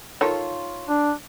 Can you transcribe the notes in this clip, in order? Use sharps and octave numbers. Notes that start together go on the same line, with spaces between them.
D#3 F4 A4 C#5
D4